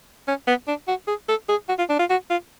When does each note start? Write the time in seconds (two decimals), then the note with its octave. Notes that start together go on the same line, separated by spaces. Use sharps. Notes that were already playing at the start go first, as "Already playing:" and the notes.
0.28 C#4
0.47 B3
0.68 D4
0.88 F#4
1.08 G#4
1.29 A4
1.49 G#4
1.69 F#4
1.79 F4
1.89 D4
1.99 F4
2.10 F#4
2.30 F4